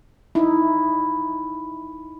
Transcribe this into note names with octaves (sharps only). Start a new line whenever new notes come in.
D#4 E4